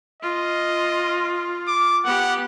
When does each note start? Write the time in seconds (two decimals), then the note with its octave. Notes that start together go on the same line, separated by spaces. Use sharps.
0.22 F4 D#5
1.68 D6
2.05 B3 G4 F#5